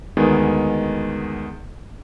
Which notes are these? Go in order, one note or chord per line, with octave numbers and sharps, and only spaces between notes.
D2 D#3 G#3 B3